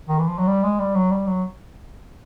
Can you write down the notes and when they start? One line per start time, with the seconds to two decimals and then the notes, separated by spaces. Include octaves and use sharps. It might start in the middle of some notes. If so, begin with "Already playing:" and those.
0.09 D#3
0.19 E3
0.28 F3
0.38 F#3
0.48 G3
0.64 G#3
0.79 G3
0.95 F#3
1.11 G3
1.27 F#3